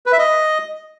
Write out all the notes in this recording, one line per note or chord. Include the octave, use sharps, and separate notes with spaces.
B4
E5
D#5